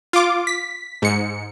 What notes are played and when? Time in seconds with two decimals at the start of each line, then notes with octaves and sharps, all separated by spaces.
0.13 F4 D6
0.47 B6
1.02 G#2 C#7